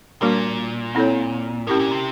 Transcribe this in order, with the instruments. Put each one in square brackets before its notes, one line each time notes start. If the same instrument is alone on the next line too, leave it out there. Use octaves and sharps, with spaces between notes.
[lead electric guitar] A#2 [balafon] G3 A#3 D4 F#4 A#4
[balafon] C4 E4 A4 C#5
[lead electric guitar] A2 [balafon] C#4 E4 G4 A#4
[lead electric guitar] A#2
C3